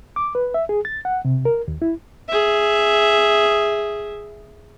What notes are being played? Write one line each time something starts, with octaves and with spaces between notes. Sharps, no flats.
D6
B4
E5
G#4
A6
F#5
C3
A#4
D#2
E4
G#4 E5